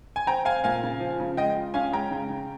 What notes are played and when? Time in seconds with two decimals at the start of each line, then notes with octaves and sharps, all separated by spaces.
0.16 G#5
0.27 C4 G5 A#5
0.45 C4 F5 G#5
0.64 A#2 F5 G#5
0.83 C#3
1.00 F3
1.20 C#3
1.37 G#3 D#5 G5
1.57 F4
1.74 C#4 F5 G#5
1.93 G#3 G5 A#5
2.11 C#3
2.30 C#3